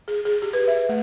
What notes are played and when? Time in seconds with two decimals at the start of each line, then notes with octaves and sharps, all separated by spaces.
0.08 G#4
0.25 G#4
0.42 G4
0.53 B4
0.68 E5
0.89 A3